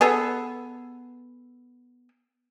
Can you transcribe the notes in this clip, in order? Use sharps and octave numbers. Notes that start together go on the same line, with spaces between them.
B3 G#4 A4